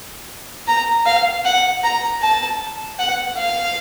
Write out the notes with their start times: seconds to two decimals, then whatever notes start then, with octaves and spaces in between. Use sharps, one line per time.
0.67 A#5
1.06 F5
1.45 F#5
1.84 A#5
2.22 A5
2.99 F#5
3.38 F5